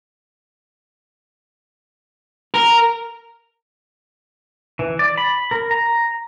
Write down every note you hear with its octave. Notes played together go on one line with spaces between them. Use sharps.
A#4
E3
D5
B5
A#4
A#5